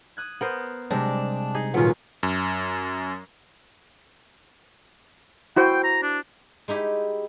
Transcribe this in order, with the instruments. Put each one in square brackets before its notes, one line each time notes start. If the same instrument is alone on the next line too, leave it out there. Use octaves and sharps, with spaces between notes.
[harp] D#6 F#6 G#6
[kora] B3 A#4 C5
[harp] C3 G3 G#3 [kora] C4 [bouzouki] D4
[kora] D#4 G#4
[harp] D#1 G#1 A#2 [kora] F#3 C#4 [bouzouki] B3 [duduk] F4
[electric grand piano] F#2
[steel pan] E4 F#4 C5 [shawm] G5
[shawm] A#5
D4
[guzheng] G#3 D#4 E4 G4